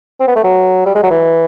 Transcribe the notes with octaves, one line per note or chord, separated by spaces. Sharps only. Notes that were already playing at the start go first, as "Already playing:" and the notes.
C4
B3
A3
F#3
G3
G#3
F#3
E3